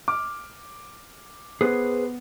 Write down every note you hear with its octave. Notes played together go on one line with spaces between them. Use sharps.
D6 F6
B3 G#4 B4 C5